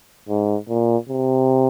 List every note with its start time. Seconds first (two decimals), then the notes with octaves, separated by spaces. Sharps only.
0.29 G#2
0.69 A#2
1.09 C3